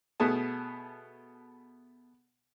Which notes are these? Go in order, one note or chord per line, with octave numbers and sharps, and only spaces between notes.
B2 A3 B3 G#4 A5